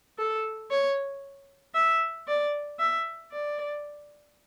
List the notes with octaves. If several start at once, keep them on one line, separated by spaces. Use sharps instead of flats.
A4
C#5
E5
D5
E5
D5